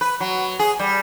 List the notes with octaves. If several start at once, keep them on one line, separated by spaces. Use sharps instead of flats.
B4
F#3
G#4
G3